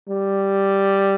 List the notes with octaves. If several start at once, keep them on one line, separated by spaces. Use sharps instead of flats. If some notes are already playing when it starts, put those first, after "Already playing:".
G3